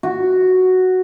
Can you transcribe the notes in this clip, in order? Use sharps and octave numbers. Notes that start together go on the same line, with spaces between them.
F#4